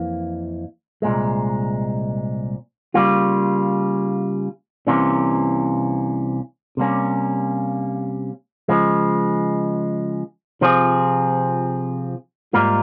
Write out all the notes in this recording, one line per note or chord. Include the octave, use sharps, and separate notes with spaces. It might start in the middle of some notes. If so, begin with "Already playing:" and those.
Already playing: F2 E3 A#3
C2 A#2 G#3
C#3 G3 A#3 F4
C2 C3 E3 A#3 C#4
C3 G3 A#3 C#4
C#3 F3 G#3
C3 F3 C4 F4 G#4
G#2 G3 A#3 F4 A#4